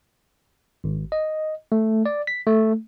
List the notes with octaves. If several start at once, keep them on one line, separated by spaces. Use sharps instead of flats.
G#1
D#5
A3
D5
B6
A3